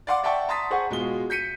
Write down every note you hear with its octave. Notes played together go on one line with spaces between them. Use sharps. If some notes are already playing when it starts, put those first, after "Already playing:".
D5 F5 F#5 C6 D6
D5 E5 F#5 G5 A5 C#6
A5 A#5 C6 D#6 A6 B6
G#4 C5 F#5 C#6
B2 G#3 F4 G7
G6 B6 C#7 D#7